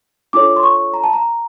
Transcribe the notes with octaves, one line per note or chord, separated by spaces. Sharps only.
D4 F4 A4 C#5 D6
C6
C#6
A#5
A5
A#5